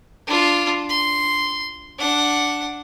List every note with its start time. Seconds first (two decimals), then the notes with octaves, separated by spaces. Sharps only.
0.27 D4 F4
0.89 C6
1.99 D4 F#5